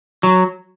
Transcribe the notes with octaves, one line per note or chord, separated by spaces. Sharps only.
F#3